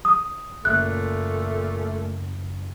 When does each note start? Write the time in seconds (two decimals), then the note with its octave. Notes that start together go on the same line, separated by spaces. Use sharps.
0.05 D#6
0.65 F#1 A#2 A3 F#6